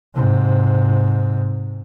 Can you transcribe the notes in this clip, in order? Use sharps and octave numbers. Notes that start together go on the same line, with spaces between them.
G#2 C3